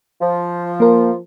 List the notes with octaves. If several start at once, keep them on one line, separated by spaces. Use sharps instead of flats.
F3
A#3 A#4